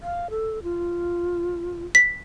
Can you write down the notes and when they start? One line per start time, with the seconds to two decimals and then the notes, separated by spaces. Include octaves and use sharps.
0.01 F5
0.30 A4
0.63 F4
1.95 B6